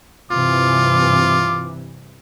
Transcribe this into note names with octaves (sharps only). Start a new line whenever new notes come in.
G2 C3 E3 F4 D6